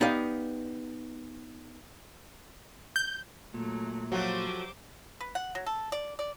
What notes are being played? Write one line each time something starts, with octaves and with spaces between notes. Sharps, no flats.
B3 D#4 G4 D5 F5
G6
A#2 F#3 A3
F3 F#3 A3 F#4 G4 C5 D6
B4
F#5
F#3
A4
D5
D5